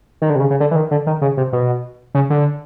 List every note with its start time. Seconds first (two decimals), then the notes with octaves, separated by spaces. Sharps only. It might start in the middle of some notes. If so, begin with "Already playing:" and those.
0.22 D#3
0.30 D3
0.36 C3
0.40 C#3
0.50 C#3
0.60 D3
0.71 E3
0.76 D#3
0.91 D3
1.07 D#3
1.22 C#3
1.37 C3
1.53 B2
2.15 C#3
2.30 D3